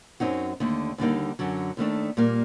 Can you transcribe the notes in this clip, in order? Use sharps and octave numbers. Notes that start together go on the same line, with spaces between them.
F#2 F#3 C4 D#4 F#4
D#2 D3 A3
D#2 D3 G3 A#3 D#4
F#2 D3 F#3
D#2 D#3 A3 D4
A#2 G3 A#3